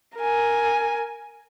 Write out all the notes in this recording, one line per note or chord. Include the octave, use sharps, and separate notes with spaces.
A#4 G#5